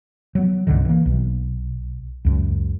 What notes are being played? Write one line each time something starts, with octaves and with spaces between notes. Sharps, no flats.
F#3 B3
C2 G2 D3 D#3
E3 A#3
B1
C#2 F#2